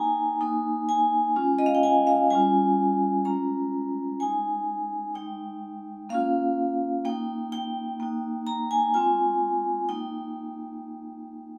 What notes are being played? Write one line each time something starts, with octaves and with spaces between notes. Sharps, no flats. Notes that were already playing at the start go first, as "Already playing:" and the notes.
Already playing: A#3 D#4 G5 G#5 A#5
A#3 D#4
G#5
G#3 C#4 F4
D#5
F5
G5
G#5
F5
G3 C#4 F4 G#5
G#3 C#4 F4 A#5
G#3 D#4 G#5
G#3 D#4 G5
A#3 C#4 F4 F5
A#3 D#4 G5
G5
A#3 D#4
A#5
G#5
G#3 C4 F4 G#5
A#3 D#4 G5